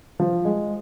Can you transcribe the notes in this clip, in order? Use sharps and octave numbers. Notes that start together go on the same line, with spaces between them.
F3
G#3